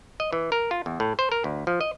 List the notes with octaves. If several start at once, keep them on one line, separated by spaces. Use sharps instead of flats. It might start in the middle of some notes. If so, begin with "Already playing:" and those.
D#5
E3
A#4
F4
E2
A2
C5
A#4
D2
F3
D#5